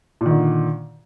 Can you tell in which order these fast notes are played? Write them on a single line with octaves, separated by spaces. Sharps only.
A#2 D#3 D3